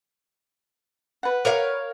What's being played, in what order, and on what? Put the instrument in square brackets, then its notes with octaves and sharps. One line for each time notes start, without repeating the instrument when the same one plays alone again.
[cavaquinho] B4 F#5
[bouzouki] A#4 C#5 F5